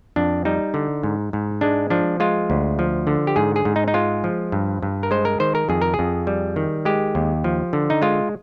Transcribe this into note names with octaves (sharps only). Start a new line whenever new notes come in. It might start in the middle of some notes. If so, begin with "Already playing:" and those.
F2 D4
G3 D#4
D3
G#2
G#2
G#3 D4
F3 D4
G#3 F4
D2
F3
D3
G4
G#2 G#4
G#4
G#2
D#4
D#4
G#3 F4
F3
G2
G2
A#4
G#3 C5
A#4
D#3 C5
A#4
F2 G#4
A#4
G#4
F2
G3
D#3
G#3 G4
D#2
F3
D3
D#4
G#3 F4